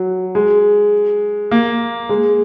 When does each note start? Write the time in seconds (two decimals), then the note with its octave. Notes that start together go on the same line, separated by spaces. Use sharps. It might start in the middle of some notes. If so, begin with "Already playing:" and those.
Already playing: F#3
0.35 G#3
1.51 A#3
2.09 G#3